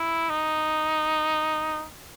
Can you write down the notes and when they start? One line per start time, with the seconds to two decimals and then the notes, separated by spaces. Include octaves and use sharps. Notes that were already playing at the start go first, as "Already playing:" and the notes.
Already playing: E4
0.29 D#4